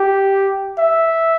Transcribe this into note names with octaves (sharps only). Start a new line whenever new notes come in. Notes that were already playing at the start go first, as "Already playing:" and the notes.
Already playing: G4
E5